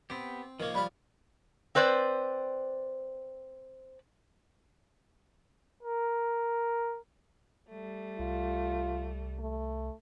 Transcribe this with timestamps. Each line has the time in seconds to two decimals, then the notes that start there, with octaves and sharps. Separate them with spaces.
0.10 B3 C4 G4
0.60 D#3 F3 A#3 C#5
0.75 G3 F4 B5
1.75 C4 B4 C5 D5
5.83 A#4
7.70 G3 A3
8.19 C2 F4
9.39 A3